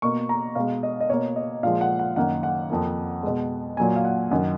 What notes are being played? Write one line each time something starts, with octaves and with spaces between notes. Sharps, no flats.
B2 A#3 C#6
A#5
B2 G#3 F5
D#5
D#5
B2 A#3 C#5
D#5
A#2 F3 G#3 F5
F#5
F#5
F#2 D#3 A#3 F#5
F#5
F2 F3 A#3
B2 G#3
A#2 F#3 A#3 G#5
F5
F#5
F#2 D#3 F#3 F#5